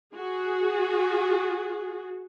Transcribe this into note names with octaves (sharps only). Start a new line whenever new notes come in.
F#4 G#4